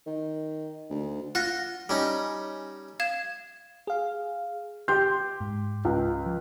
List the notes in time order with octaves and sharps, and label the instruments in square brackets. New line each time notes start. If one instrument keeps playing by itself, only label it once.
[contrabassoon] D#3
D2
[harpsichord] F4 [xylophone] F#5 F#6 A#6
[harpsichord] G3 C#4 D#4
[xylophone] F5 G#6 E7
[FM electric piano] G#4 F5
[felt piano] G4 G6 [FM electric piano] C6
[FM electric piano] G#2
[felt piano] C#2
[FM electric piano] F3